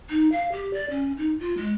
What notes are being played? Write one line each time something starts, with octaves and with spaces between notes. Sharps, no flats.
D#4
F5
G4
D5
C#4
D#4
F4
G#3